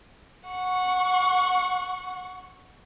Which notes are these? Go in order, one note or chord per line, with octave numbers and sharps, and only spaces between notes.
F#5 C#6